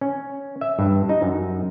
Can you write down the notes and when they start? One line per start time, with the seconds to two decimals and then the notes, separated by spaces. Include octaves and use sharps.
0.01 C#4
0.61 E5
0.79 G2
1.09 D#4
1.22 F#2